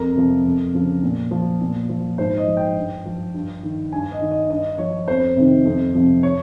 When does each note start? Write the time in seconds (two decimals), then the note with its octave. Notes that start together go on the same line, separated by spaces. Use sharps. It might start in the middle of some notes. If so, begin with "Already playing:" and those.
Already playing: F2 A#4
0.15 C3 F3
0.44 F2
0.74 C#3 F3
1.03 A#2
1.31 F3
1.61 A#2
1.89 F3
2.18 G#2 C5
2.37 D#5
2.47 F3
2.57 G5
2.76 G2
3.05 F3
3.34 G2
3.63 D#3
3.92 G2 G#5
4.12 D#5
4.21 D#3
4.31 D#5
4.49 G2 D#5
4.78 F3 C#5
5.07 F2 C5
5.36 C3 D#3
5.65 F2
5.95 C3 F3
6.23 C#5